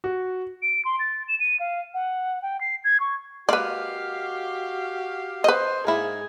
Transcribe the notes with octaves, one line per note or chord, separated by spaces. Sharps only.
F#4
D7
C6
A6
E7
D#7
F5
F#5
G5
C7
G#6
C#6
G#3 A#3 F#4 G4 B4 D5 F5
B4 C5 D#5
G#2 A#3 E4 G#4